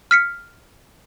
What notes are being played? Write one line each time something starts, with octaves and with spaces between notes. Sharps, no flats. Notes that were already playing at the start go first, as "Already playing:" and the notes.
F6 B6 C#7